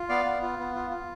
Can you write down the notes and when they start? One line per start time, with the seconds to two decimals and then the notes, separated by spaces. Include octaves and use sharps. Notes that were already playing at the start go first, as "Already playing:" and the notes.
Already playing: F4
0.09 B3 D5 F5
0.25 B3
0.42 F4
0.59 B3
0.75 F4
0.90 F4